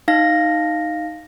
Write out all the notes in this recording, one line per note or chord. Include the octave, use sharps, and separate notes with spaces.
D#4 F5 A#6